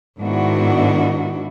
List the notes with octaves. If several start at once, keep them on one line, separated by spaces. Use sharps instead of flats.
G#2 D#3 B3 D4 E4 F#4